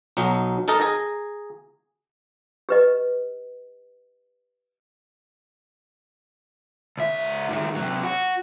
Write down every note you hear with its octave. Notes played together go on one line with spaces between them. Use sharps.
B1 F#3 D#4
D#4 A4 A#4 D#5
G#4 A#5
G4 B4 D#5
C#2 E5
A2 D#3
C3 F#3
F#4